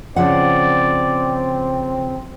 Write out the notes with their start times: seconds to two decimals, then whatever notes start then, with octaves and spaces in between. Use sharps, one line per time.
0.16 C#3 F3 C4 D5 F#5